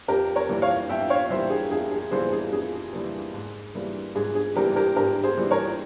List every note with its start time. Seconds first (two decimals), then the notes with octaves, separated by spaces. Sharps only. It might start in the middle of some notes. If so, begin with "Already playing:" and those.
0.08 F2 G4 A#4
0.36 A#4 C#5
0.49 E3 G3 A#3
0.62 C#5 F5
0.89 F2 E5 G5
1.10 C#5 F5
1.30 E3 G3 A#3 C5 E5
1.50 G#4
1.71 F2 G#4
1.91 G#4
2.11 E3 G3 A#3 G#4 C5
2.32 G#4
2.52 F2 G#4
2.93 E3 G3 A#3
3.34 G#2
3.75 E3 G3 A#3
4.15 G#2 G#4
4.35 G#4
4.56 E3 G3 A#3 G4 A#4
4.76 G4 A#4
4.96 G#2 G4 A#4
5.24 G#4 C5
5.37 E3 G3 A#3
5.51 A#4 C#5